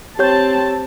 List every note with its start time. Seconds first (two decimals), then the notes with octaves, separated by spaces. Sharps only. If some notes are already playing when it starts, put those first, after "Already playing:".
0.19 C4 G4 C#5 A5 G6